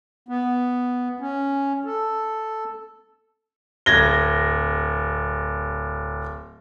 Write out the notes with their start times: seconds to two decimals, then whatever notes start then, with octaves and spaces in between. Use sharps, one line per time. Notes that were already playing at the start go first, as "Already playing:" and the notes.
0.29 B3
1.20 C#4
1.85 A4
3.86 D1 G#6 A#6 G7